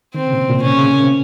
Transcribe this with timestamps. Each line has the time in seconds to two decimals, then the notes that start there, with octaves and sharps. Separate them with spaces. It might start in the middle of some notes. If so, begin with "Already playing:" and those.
0.14 D#3 C4
0.27 C#3
0.32 A#2
0.38 C3
0.50 A#2
0.62 C#4
0.78 C#3
0.94 A#3
1.04 C4